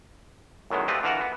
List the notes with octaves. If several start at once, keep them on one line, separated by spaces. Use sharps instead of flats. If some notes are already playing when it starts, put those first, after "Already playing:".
F#2 A2 D#3 G#3 B3
A3 C4 F4 G4 B4 D#5
D3 E3 F4 F#4 A#4 F#5
B3